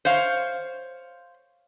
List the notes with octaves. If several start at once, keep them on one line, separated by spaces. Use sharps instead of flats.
C5 C#5 F5